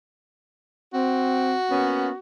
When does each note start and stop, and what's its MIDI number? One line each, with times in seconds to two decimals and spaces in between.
0.93 1.54 60
0.93 2.18 66
1.71 2.10 58
1.71 2.10 59
1.71 2.10 61